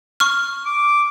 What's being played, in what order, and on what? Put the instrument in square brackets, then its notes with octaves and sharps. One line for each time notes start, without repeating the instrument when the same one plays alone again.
[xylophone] C#6 F6
[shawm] D6